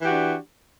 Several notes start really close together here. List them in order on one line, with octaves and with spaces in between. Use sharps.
E3 G4 F#4 D4